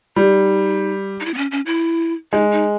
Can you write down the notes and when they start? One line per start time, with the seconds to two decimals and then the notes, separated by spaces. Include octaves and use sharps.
0.16 G3 D#4
1.20 D#4
1.25 E4
1.34 B3
1.38 C#4
1.51 C#4
1.66 E4
2.33 G#3 D#4
2.52 D#4